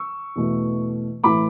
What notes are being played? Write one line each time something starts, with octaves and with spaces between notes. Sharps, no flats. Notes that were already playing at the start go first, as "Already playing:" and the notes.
Already playing: C#6 E6
E2 B2 A3
A2 E3 A3 B5 D6